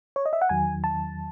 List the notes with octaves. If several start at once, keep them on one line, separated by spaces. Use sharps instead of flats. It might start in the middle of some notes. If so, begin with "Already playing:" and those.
C#5
D#5
E5
F#5
E2 D#3 F#3 G#5
A5